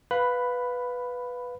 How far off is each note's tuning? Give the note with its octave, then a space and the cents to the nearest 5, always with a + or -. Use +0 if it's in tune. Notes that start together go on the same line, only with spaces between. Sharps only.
B4 +0 F5 +15 B5 +10